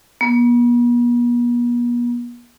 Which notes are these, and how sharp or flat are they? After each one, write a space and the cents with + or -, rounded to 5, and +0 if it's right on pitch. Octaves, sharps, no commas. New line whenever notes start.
B3 -45